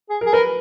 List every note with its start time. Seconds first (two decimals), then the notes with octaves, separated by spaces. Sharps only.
0.10 G#4
0.21 A#4
0.26 G#4
0.33 A#4 B4